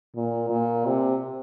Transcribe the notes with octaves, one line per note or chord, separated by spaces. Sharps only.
A#2
A#2
C3